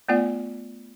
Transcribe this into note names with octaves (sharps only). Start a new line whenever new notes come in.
A3 B3 F4 D5 F#5